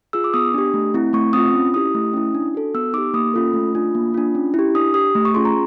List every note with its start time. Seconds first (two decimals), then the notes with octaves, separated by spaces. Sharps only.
0.13 F4 G#4 E6
0.24 D6
0.34 B3 D#6
0.54 D4 G4
0.74 A3
0.94 C4 E4
1.13 A3 C#6
1.33 C4 F4 D#6
1.54 C#4
1.74 E4 G4 D#6
1.94 A3
2.13 C#4 E4
2.35 D4
2.54 F#4 A4
2.74 B3 E6
2.93 D#4 G4 D6
3.14 A#3 D#6
3.34 C#4 F4 A4
3.54 A3
3.75 D4 F4
3.95 A#3
4.14 D4 F4
4.35 C#4
4.54 E4 G4
4.75 D4 D#6
4.94 G4 D#6
5.15 A3
5.25 C#6
5.34 C#4 F4 G#4 C6
5.45 A#5